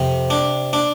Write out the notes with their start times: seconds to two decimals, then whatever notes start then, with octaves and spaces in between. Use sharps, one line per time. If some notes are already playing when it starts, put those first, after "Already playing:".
Already playing: F2 C3
0.30 D4
0.73 D4